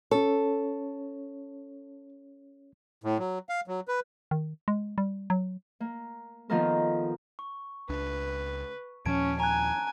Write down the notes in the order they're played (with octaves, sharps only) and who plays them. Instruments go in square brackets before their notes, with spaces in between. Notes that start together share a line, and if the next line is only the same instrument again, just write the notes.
[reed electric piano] C#4 C#5 [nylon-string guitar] A4
[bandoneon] A2
F#3
F5
F#3
B4
[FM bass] D#3
G#3
G3
F#3
[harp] A#3
D#3 F3 A#3 B3 A4 A#4
[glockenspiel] C#6
[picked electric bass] C#2 D4 [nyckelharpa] B4
[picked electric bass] D#2 A#2 F3 [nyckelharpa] C#4 [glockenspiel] A5 G#6 D7
[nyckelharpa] G#5 [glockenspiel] A#5 F#6